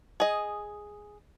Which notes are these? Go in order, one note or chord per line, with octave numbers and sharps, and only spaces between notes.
G#4 D#5